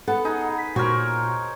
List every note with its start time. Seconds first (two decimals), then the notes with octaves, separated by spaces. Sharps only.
0.07 B3 A4 F#5
0.25 D#4 G#4
0.58 B6
0.76 A#2 F#4 A#4 C5 C#5